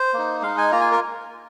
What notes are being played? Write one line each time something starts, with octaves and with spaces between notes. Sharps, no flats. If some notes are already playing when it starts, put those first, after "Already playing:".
Already playing: C5
A#3 D#4
G#3 D#4 F5
G#5
A#3 F4 A#5
G#5
A#4